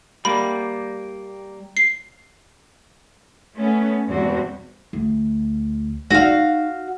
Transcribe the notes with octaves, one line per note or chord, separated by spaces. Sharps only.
G3 A#3 B5
C7
A3 B3 C#4
E2 G2 B2 G#3 C4 F#4
D2
D#4 F#4 F5